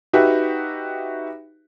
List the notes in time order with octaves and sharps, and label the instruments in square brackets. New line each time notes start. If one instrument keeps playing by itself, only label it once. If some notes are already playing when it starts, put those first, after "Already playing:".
[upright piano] D#4 F#4 G4 B4 E5